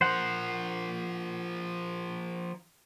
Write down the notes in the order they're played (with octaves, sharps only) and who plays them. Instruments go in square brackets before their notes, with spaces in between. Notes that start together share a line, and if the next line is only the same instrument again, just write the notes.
[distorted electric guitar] F3 A#4 [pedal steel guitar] C5 F#5